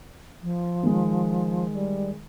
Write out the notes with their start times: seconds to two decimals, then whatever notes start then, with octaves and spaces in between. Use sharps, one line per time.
0.43 F3
0.83 D#3 G#3
1.74 G3